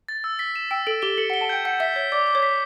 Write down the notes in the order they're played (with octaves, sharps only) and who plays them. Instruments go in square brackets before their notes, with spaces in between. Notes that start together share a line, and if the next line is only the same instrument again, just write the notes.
[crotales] A6
E6
B6
E7
[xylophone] G5 [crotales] E6
[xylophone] A4 [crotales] D7
[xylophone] G4 [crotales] G7
[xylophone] A4 [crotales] C#7
[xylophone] F#5
[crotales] G7
[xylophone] A5
[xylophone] G5 [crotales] G6
[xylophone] F#5 [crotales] G6
[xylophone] E5 [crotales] B6
[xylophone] C#5 [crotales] B6
[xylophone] D5 [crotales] D6
[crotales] D6
[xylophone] C#5
[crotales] B6